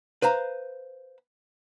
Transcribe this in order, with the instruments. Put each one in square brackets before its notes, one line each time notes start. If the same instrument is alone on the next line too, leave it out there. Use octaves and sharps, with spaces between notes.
[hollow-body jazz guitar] B4 C5 F5 A#5